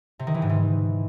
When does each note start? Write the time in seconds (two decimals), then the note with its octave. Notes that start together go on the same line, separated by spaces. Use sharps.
0.19 C3
0.27 D#3
0.34 E3
0.42 G#2
0.49 E3